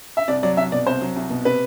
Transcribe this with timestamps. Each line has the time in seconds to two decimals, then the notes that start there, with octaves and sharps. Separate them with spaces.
0.17 E5
0.28 C2 D5
0.43 F#3 D5
0.57 C2 E5
0.72 B2 D5
0.86 C2 C5
1.01 F#3
1.16 C2
1.30 B2
1.45 C3 B4